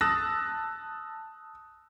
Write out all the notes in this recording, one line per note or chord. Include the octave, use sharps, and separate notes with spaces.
A5 D#6 E6 F#6 A6 A#6